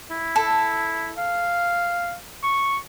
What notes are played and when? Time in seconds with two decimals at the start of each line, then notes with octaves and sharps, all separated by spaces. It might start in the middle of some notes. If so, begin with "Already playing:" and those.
0.11 E4
0.36 A4
1.18 F5
2.44 C#6